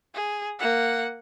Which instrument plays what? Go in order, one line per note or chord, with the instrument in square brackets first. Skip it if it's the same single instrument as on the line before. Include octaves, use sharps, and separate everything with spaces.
[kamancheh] G#4
A#3 F#5